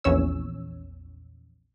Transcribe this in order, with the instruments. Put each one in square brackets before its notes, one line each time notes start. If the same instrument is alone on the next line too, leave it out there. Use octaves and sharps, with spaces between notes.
[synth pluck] A#1 E2 C#4 C#5 E6